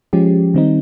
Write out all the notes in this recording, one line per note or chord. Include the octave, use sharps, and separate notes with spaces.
F3 G#3 C#4 G4
D#3 G3 C4 D#4